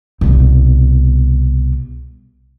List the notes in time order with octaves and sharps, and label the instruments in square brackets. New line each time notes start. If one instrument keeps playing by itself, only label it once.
[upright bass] C2 B2